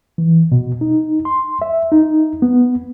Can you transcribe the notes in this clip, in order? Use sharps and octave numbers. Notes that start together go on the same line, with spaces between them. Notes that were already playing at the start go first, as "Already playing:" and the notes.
E3
B2
D#4
C6
E5
D#4
B3